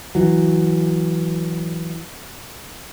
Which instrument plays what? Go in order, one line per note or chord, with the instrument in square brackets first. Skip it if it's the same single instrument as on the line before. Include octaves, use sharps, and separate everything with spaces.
[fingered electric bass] E3 F#3